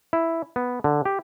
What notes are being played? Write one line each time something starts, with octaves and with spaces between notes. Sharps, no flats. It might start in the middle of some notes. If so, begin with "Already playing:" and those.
E4
B3
D3
G4